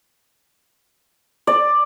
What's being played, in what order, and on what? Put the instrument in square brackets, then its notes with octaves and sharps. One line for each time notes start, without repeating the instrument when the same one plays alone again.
[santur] D5